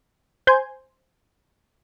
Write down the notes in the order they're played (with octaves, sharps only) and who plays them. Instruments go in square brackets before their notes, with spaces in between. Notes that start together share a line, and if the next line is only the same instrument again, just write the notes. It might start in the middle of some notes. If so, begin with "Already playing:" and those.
[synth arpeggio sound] C5 G#5 C6 G6 G#6